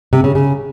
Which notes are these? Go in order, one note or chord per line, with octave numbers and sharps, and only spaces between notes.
C3
C#3
C#3